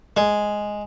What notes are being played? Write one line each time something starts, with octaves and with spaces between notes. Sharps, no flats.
G#3